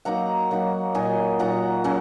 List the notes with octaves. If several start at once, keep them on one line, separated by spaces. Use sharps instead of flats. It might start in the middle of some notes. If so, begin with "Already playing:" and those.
F#3 A#3 D#4 F#5 A#5
F#3 A#3 D#4
A#2 F#3 D#4 D#5 G#5
A#2 F#3 D#4 F#5 A#5
C#3 F#3 C#4